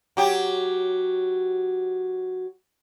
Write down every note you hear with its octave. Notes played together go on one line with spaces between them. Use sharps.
F#3 G4